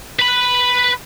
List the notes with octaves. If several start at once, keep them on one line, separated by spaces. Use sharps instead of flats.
B4 B5